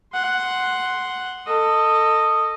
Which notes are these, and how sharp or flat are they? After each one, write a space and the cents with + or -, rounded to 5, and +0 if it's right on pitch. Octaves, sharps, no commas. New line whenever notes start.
F#5 +0 C6 +0
A4 +20 D#5 -5